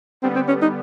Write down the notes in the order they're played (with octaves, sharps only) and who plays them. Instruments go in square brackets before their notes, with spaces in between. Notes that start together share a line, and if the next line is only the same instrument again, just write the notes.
[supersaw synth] D3 G3 B3 [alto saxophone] C4
[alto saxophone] C4
C#4
D#4